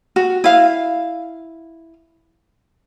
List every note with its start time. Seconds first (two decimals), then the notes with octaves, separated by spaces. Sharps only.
0.16 F#4
0.44 E4 F5